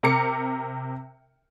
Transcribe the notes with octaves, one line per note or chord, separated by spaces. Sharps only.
C3 A#4 A#5 D6 C#7